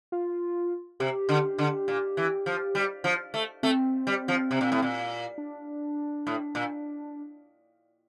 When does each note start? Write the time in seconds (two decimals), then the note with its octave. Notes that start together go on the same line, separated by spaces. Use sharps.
0.12 F4
1.00 C3 G4
1.29 D3
1.58 D3
1.88 A#2
2.17 E3
2.46 F3
2.75 G3
3.04 F3
3.34 A3
3.63 A3 C4
4.07 G3
4.28 F3
4.51 C3
4.61 A#2
4.72 A2
4.82 A#2
5.38 D4
6.27 A2
6.55 A#2